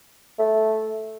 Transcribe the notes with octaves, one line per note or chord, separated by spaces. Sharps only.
A3